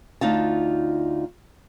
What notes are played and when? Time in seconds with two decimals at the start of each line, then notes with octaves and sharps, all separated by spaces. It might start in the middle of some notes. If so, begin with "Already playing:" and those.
0.21 D2 D#4 F4 A5